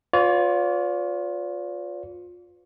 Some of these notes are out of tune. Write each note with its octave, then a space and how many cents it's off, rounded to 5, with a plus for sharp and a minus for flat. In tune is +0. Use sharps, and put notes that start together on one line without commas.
F4 +25 B4 +35 D5 -45